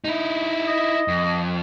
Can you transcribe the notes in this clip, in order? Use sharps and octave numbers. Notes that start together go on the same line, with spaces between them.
D#4 E4
D#5
F2